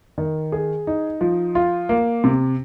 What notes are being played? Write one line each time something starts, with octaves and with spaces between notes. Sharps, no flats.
D#3
G#4
D#4
F3
F4
A#3
C3